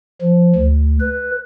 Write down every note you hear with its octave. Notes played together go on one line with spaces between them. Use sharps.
F3
D2
B4